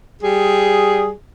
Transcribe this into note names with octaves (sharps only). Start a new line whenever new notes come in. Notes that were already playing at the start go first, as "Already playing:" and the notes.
G3 G#4